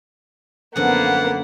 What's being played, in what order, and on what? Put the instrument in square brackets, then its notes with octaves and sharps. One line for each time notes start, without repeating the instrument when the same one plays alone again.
[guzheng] F#2 D3 F3 [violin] A#3 B3 [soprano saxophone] F#5